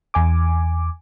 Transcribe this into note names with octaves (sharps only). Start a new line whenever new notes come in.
E2 G#5 D6